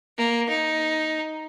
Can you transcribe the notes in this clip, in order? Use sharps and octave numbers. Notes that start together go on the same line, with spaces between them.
A#3
D#4